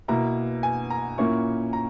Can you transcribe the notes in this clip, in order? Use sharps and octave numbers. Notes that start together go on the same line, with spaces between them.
B2 A#3 E4 A#5
G#5
A#5
A#2 A#3 C#4 E4 C#6
A#5